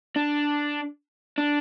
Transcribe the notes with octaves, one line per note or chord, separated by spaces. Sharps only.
D4
D4